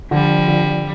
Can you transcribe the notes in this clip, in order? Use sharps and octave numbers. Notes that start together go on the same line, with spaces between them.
D3 F3 G3
D3